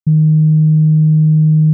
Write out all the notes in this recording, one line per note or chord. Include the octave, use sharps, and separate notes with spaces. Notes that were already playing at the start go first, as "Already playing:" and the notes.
D#3